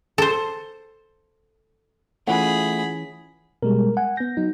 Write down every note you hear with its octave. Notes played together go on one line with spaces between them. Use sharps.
A4 C5
E3 A3 C#4 F4 G#4 F#5 B5
B2 G3 G#3 A#4
F#5 G#5
B3 G6 A#6
F#3 D#4